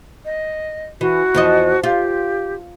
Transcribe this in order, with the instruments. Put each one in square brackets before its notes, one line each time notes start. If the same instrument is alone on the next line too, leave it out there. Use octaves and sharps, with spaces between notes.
[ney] D#5
[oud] E3 [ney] F#4
[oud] E2 F3 D#5
[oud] F4 [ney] G4